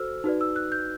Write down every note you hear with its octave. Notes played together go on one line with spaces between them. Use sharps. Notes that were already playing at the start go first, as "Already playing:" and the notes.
Already playing: F#4 A4 C5 E6 F6
D#4 F#4 B4 D5
E6
F#6
G6